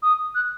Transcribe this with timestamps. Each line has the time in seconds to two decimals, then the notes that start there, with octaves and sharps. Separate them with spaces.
0.03 D#6
0.35 F#6